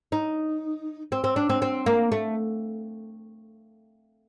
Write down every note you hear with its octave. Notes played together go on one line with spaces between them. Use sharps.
D#4
C4
C4
D4
C4
C4
A#3
A3